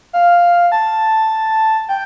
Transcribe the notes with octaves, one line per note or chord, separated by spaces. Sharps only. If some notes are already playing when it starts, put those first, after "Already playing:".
F5
A5
G5